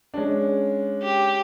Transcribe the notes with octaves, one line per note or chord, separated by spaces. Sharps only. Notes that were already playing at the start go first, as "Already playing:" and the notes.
G#3 C#4 D4
G4